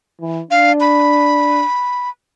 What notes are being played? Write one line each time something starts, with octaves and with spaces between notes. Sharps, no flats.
E3
D4 F5
B5